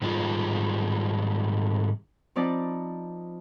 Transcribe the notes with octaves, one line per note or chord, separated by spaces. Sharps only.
G#2 D#3 G3 C4 F4 G#4
F3 C4 D#4 D5 A5 B5